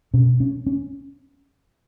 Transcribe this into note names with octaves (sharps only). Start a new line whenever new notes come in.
B2 C#4
C#4
C#4